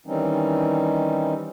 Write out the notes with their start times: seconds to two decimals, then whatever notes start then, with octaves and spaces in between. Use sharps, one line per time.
0.06 D#3 E3 G3 C4 C#4 D#4